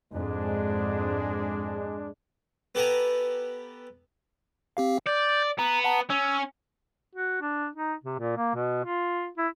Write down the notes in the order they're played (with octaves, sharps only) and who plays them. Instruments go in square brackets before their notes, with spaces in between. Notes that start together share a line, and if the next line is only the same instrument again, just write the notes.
[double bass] F2 G#2 [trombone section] G#3 D4
[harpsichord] B3 G4 A4 F#5 G#5 A#5
[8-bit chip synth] C4 G4 F5
[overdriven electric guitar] D5 [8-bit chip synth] G6 A6
[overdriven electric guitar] B3 [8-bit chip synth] A#5
[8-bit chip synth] F#5 A5 A#5
[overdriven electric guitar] C#4 [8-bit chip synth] E6
[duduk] F#4
D4
D#4
C3
A#2
A#3
B2
F4
E4